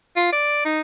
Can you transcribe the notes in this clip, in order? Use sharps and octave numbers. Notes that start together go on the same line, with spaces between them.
F4
D5
D#4